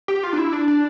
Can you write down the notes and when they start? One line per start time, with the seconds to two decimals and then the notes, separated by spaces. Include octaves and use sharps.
0.08 G4
0.23 F4
0.33 D4
0.37 E4
0.53 D4
0.68 D4